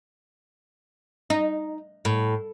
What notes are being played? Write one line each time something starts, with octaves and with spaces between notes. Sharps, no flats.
D#4
A2